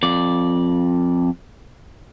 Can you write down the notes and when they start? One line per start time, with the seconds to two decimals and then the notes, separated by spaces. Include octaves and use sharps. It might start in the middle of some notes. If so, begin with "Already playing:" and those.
0.03 F2 D5